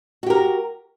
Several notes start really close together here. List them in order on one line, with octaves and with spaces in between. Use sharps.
F#4 G4 A#4